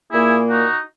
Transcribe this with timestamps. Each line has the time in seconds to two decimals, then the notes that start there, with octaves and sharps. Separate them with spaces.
0.10 A#2 A#3 E4 G#4
0.49 D#4 F#4